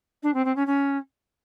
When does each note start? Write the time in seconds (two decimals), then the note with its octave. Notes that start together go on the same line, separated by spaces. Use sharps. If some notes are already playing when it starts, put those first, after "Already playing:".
0.23 D4
0.34 C4
0.44 C4
0.55 C#4
0.66 C#4